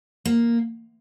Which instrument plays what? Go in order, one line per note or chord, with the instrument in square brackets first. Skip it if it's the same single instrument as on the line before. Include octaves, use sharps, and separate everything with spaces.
[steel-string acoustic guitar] A#3